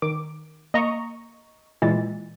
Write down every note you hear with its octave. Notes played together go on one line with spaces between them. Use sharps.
D#3 D6
A#3 D#5 A#5 C#6
A#2 E3 G#3 A6